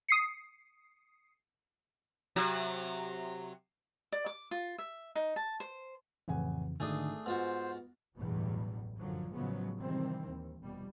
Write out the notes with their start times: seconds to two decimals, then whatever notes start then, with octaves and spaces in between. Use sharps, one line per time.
0.09 D#6 C7 C#7
2.36 C3 F#3 F#4
4.12 D5
4.26 D6
4.51 F4
4.78 E5
5.15 D#4
5.36 A5
5.60 C5
6.28 A1 F2 C#3 E3 F#5 G#5
6.80 G#1 D3 D#3 A3 D4 G#4 G#5 D#6
7.26 G#2 B3 F4 F#4 C5
8.16 A1 E2 G2 B2 F#3 G3
8.98 F#2 D3 F3 F#3
9.33 A2 C#3 F3 F#3 G#3 B3
9.78 C3 D#3 E3 G3 C4
10.26 D#2
10.61 F1 B2 G3